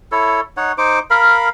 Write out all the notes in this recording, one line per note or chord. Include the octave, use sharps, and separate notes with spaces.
E4 A4 C#5
D#4 C#5 F#5
D#4 C5 D6
A#4 F5 B5